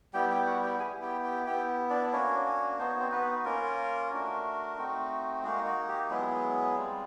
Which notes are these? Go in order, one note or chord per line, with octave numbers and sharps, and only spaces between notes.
G3 B3 E4 G4 G5
G4 G5
F#4 F#5
G4 G5
B3 E4 G#4 G#5
G4 G5
G4 G5
B3 E4 G4 G5
D4 D5
A#3 C#4 D4 F#4 C#5
C#4 C#5
B3 D#4 F#4 C5
C#5
C4 C5
B3 B4
A#3 C#4 F4 A#4
A3 D4 F#4
A3 C4 D#4 F#4
G#3 A#3 D#4 F#4 G#4
F#4
G4
F#3 G#3 B3 E4 G#4
G3 C4 F4